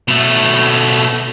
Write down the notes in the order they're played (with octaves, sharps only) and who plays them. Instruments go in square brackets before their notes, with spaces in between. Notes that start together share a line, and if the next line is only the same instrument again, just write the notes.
[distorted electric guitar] B2 A3